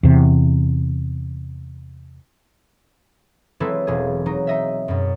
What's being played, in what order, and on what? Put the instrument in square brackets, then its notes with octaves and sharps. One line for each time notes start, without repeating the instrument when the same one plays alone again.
[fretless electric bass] E2 C3
[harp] F#3 G#3 C4 E4 A4 B4
E1 G#4
F#3 D#4
D#4 D#5 E5
F#2 B2